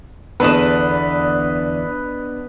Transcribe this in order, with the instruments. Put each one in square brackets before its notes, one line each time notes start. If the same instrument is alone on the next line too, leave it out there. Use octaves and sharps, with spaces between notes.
[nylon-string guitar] E2 D3 A5 [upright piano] B3 D4 [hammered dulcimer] B4 D#5